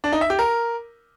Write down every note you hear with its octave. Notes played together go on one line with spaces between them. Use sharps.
D4
D#4
E5
G4
A#4